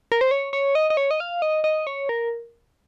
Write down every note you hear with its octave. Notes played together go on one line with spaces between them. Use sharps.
A#4
C5
C#5
C#5
D#5
D#5
C#5
D#5
F5
D#5
D#5
C#5
A#4